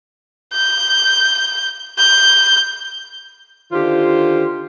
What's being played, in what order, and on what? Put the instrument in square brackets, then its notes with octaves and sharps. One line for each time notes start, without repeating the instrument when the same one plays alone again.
[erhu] G6
G6
[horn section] D3 D#3 F4 G4 C5